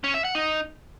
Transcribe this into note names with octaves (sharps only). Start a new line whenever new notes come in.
C#4
E5
F#5
D#4